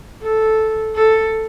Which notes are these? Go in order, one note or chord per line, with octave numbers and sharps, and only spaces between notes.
A4
A4